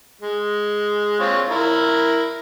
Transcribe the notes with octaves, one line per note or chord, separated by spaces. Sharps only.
G#3
C4 F4 C#5
E4 A#4